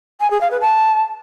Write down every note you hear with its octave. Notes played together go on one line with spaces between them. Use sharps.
G#5
G#4
F5
B4
A5